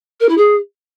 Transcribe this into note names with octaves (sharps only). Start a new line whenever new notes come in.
A#4
E4
G#4